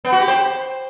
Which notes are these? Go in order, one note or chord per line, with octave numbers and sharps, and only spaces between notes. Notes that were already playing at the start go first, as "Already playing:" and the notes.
B3
F#4
G4
C5